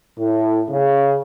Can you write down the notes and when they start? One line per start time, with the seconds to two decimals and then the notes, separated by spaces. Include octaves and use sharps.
0.19 A2
0.71 C#3